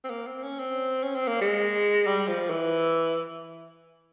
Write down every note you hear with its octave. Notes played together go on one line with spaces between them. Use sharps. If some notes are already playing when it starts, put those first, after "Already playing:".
C4
A#3
C4
C#4
C4
C#4
C4
A#3
G#3
G3
F3
E3